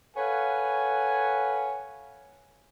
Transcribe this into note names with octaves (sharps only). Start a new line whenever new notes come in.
A4 B4 C#5 F5 F#5 G#5